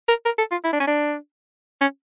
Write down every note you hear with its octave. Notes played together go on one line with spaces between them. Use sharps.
A#4
A#4
A4
F4
E4
D4
C#4
D4
C#4